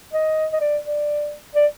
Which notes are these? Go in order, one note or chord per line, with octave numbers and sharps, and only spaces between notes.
D#5
D#5
D5
D5
D5